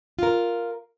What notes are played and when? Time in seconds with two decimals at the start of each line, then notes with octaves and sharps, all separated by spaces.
0.19 F4 A#4